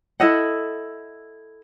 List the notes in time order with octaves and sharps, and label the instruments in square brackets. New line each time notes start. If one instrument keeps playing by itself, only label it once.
[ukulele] E4 A4 D#5 F#5